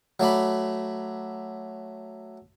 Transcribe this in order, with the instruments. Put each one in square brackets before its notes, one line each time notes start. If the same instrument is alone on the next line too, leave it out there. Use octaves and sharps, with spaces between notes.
[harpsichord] F#3 A3 D5 B5